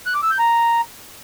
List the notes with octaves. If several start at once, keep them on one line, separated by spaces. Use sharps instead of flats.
F#6
D6
E6
G6
A#5